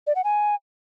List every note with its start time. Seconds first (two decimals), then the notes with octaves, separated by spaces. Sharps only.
0.07 D5
0.16 F#5
0.24 G#5